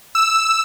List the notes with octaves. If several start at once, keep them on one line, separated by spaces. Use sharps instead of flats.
E6